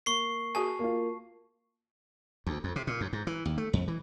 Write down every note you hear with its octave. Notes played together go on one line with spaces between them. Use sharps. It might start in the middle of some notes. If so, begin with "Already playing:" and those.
A#3 C#6 C7
F#4 G#4 G#5 A5
A#3 F4
D2
F2
C3
A#2
F#2
G#2
E3
D#2
A3
F2
E3